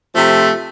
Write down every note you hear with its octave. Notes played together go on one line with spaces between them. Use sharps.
C3 F3 A3